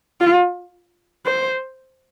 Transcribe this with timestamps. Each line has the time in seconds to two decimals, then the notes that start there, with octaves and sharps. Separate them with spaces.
0.21 F4
1.26 C5